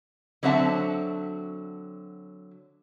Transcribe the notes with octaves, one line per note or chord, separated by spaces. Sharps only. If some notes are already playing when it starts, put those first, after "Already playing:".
D3 F#3 C4 F#4 E5 A5